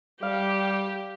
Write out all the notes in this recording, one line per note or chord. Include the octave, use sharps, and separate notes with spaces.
G3 G4 F5